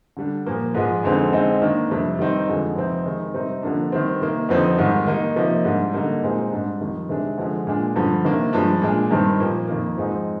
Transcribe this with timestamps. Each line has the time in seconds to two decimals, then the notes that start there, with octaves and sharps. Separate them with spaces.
0.17 D3 G3 D4
0.46 A#2 F3 A#3
0.75 G#2 F3 G#3
1.03 F2 D3 G#3 C4 D#4
1.33 D3 G#3 C4 D#4
1.62 D#3 A#3 D4
1.90 F2 C3 G3 D4
2.19 D#3 G3 C4 D#4
2.48 F2 D3 F3 G#3
2.76 F2 C3 F3 C4 D#4
3.05 D#3 G#3 D#4
3.34 C3 G3 C4 D#4
3.63 D3 F3 A#3 D4
3.92 D#3 G3 C4
4.21 C3 D#3 A#3
4.49 F2 D3 F3 C4 D#4
4.78 G#2 D#3 G3
5.07 D#3 A#3 D#4
5.36 C3 F3 A#3 D#4
5.65 G#2 G3 D4
5.93 D3 G3 A#3 D#4
6.23 A#2 G#3 C4 D#4
6.52 G#2 G3 D4
6.81 F2 D#3 G3
7.09 C3 D#3 G#3 D4
7.38 D3 F3 G#3
7.67 A#2 G#3 D4
7.96 G2 D3 F3
8.24 C3 D#3 A#3 D4
8.53 G2 F3 G#3 D4
8.82 A#2 G#3 D4
9.11 G2 D#3 G3 C4
9.40 A#2 F3 A#3
9.68 F2 D#3 A#3
9.97 G#2 F3 G#3 C4 D#4